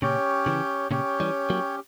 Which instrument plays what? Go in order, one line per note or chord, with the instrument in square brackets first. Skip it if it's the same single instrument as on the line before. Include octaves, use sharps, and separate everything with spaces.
[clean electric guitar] A#2 C#3 [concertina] C#4 G4 C#5 G5
[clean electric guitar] C#3 E3
[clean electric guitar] A#2 C#3 [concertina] C#4 G4 C#5 G5
[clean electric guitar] E3 G3
F#3 A#3